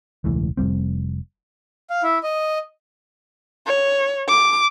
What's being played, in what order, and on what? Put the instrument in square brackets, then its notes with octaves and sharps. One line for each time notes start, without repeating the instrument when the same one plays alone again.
[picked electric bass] E1 C#2 A2 E3
F1 G#2 G3 C4
[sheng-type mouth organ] F5
E4
D#5
[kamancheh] C#5
D6